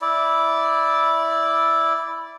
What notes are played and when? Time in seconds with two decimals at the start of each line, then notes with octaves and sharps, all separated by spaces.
0.02 E4 D5